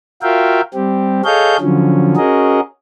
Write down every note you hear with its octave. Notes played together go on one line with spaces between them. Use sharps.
F4 F#4 A#4 E5 F5 G5
G3 C4 G4
G#4 A4 C#5 D#5 F5 G6
D3 F3 F#3 C#4
C#4 F#4 G#4 A#4 D#5